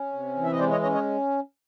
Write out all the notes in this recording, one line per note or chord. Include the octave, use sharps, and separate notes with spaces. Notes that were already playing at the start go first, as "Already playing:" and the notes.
Already playing: C#4
C3
E3
E5
D#5
G#3 C5 D5
C#5 D#5
C#4 C#5 D#5
C#5 D#5